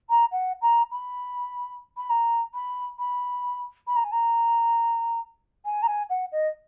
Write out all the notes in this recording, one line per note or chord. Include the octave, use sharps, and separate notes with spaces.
A#5
F#5
A#5
B5
B5
A#5
B5
B5
B5
A#5
G#5
A#5
G#5
A#5
G#5
F#5
D#5